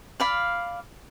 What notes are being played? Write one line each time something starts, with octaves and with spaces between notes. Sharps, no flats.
D5 F5 B5